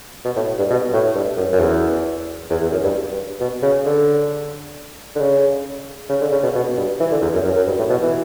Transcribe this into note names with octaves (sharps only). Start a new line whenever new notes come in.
B2
A2
G2
B2
A2
G2
F#2
F#2
E2
E2
E2
F#2
G2
B2
C#3
D3
D3
C#3
C#3
D3
C#3
B2
B2
G2
E3
D3
E2
F#2
F#2
F#2
G2
A2
B2
E3